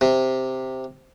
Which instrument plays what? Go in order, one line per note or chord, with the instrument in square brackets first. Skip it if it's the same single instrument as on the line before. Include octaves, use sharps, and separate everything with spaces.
[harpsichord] C3